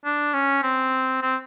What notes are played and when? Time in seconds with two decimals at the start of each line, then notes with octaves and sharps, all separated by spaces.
0.05 D4
0.34 C#4
0.63 C4
1.22 C4